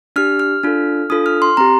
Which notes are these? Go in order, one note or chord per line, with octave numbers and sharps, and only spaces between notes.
D4 G4 F6
F6
D4 F4 A4
D4 F4 A4 D#6
F6
C6
C4 G4 A#5